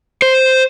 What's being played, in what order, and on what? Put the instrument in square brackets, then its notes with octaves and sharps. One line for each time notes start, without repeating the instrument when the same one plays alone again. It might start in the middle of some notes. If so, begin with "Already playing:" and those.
[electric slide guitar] C5